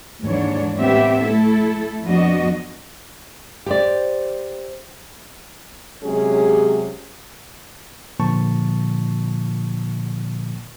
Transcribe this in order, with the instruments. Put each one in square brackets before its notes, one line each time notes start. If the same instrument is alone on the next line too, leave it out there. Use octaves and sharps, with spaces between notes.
[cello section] D#2 G#2 E3 D4 C#5
A2 B3 C4 G4 E5
A3 E4 A4
F2 F3 B3 D4 F#4 D#5
[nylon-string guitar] G4 C5 D5
[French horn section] C3 F#3 G#3 C#4 G4 G#4
[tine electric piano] A#2 D3 F3 A#3 A5 C#6